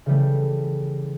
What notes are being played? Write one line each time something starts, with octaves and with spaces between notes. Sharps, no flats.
C#3 E3 G3 A3